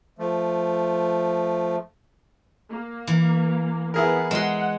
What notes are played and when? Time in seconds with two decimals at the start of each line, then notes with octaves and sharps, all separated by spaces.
0.19 F3 A3
2.69 A#3
3.07 E3
3.94 B3 E4 G#4 A#4
4.31 G#3 F#5 C6